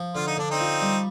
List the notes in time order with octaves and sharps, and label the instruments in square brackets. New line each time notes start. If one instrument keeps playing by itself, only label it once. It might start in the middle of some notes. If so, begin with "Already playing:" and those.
Already playing: [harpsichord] F3
[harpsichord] D3 [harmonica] F4
[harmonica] D#4
[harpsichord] D3 [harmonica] D4
[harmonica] C4 D#4
[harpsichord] F3
G3